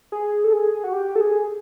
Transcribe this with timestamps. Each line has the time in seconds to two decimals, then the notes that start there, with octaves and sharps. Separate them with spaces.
0.12 G#4
0.44 A4
0.53 G#4
0.84 F#4
0.93 G4
1.16 A4
1.21 G#4